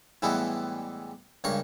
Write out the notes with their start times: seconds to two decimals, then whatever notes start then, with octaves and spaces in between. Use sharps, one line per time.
0.22 A2 E3 G3 G#3 B3 E4
1.44 C#2 G2 A#3 C#5 C#6